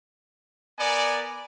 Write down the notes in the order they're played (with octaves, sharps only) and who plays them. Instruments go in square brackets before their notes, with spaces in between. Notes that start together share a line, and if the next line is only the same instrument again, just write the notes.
[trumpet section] B3 A#4 D5 [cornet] G#5